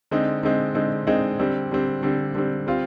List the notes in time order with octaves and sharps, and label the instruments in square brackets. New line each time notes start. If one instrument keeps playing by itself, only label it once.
[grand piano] D3 G#3 C4 D#4
D3 G#3 C4 D#4
D3 G#3 C4 D#4
D3 G#3 C4 D#4
D3 G3 C4
D3 G3 C4
D3 G3 C4
D3 G3 C4
G3 C4 F4